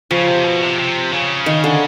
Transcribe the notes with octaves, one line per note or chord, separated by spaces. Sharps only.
C#3 F3
C3
B2
C3
C3
C#3
D#3
D3